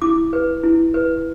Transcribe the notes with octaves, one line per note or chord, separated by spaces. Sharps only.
E4 D6
B4
E4
B4